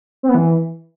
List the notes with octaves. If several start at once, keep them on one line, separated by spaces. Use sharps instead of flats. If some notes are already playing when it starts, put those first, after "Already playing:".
C4
B3
E3